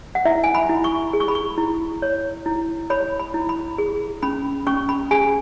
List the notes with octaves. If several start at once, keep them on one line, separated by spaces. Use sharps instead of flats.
F#5
E4 E5
G#5
B5
E4
C#6
G#4
C#6
B5
C#6
E4
C#5
E4
C#5 B5
B5
E4
B5
G#4
C#4 B5
C#4 C#6
B5
G#4 G#5